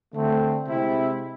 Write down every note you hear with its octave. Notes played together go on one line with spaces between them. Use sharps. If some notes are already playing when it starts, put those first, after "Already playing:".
D3 A3 C4
C3 G#3 C4 E4